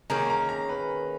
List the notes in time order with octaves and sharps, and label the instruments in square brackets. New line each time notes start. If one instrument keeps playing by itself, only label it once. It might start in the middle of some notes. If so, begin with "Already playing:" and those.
[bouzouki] D#3 A#3 C#4 G#4 [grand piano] A#5
[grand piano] A#5
A#5
B4